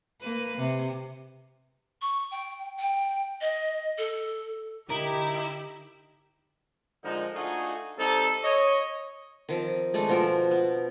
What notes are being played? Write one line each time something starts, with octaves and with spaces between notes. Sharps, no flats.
A#3 B4
C3
C#6
G5
G5
D#5
A4
D3 D#4 E4 G4 A#4
A#2 D3 F3 G#3 D#4
A3 D4 D#4 F4 F#4 G#4
G3 C4 D#4 A4
C#5 D#5
D#3 F3 C4
G#3 A3 D4 A4
B2 F3 F4 A#4
B3